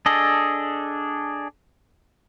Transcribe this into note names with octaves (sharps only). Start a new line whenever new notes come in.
D4 G#4 A4 D#5